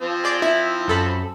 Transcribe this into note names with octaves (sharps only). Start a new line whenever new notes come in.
F3 C4
G#4 D5 G6
E4
F#2 A4 B5